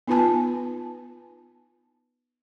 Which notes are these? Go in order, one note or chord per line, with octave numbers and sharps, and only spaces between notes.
B3 D#4 F4 B4 G#5 A5